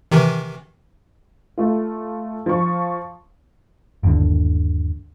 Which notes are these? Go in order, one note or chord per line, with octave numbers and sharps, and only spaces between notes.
C3 D#3 E3
A3 F4
F3 C#6
G1 D#2 D3